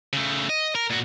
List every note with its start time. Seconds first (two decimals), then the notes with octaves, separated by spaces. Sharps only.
0.13 C#3 A3
0.50 D#5
0.75 A#4
0.90 A#2 F#4